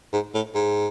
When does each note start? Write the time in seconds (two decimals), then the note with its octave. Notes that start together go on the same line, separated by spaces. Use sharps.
0.13 G#2
0.34 A2
0.55 G#2